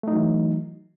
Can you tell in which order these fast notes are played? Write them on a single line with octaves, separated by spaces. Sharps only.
A3 D#4 F#3 E3